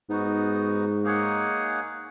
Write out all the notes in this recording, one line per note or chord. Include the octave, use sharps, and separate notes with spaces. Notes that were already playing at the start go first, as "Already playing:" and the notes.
G#2 B3 D#4 F#4
A#3 D#4 G#4 C#5 F#5